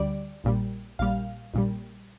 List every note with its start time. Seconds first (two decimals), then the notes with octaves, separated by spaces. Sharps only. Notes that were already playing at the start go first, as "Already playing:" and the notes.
Already playing: D2 D3 G3 D5
0.44 A#1 A#2 G3
0.99 A#1 A#2 G3 F5
1.54 A#1 A#2 G3